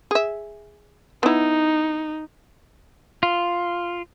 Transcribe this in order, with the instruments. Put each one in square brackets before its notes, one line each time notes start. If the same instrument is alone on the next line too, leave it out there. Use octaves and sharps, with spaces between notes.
[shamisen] G#4 E5
[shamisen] B3 E4 [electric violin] D#4
[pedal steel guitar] F4